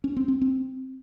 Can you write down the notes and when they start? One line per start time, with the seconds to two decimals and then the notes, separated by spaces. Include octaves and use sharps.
0.04 C#4
0.17 C4
0.28 C4
0.41 C4